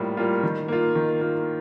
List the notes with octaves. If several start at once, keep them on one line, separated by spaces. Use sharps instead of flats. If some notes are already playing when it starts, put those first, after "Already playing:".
Already playing: A2 G3 A#3 F4
G3 A#3 F4
D#3
A#3 F4
D#3
A#3 F4